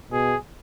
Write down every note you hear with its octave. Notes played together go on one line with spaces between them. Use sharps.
B2 G#4